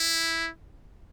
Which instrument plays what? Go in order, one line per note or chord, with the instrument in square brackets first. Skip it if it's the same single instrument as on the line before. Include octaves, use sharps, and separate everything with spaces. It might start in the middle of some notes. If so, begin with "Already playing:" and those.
Already playing: [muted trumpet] E4